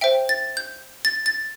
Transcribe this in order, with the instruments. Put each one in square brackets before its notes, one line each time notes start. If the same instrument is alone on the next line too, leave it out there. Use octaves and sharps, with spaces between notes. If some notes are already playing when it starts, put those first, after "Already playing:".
[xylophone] C5 E5 G5
A6
G6
A6
A6